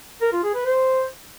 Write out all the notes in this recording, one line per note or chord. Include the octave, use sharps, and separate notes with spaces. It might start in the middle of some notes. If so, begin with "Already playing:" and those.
A#4
F4
G#4
B4
C5